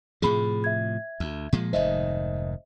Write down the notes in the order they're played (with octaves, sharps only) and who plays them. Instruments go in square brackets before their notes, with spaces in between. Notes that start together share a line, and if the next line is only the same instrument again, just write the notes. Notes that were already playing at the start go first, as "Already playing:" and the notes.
[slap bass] A2 C3 F3 [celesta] G#4 B5
[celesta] E5 G#6
[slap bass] D2
A#2 F3 G#3
[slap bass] F1 G#2 D#3 [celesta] C5 D#5 E5